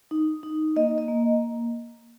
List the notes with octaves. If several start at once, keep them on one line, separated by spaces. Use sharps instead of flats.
D#4
D#4
A#3 D#5
D#5
A#3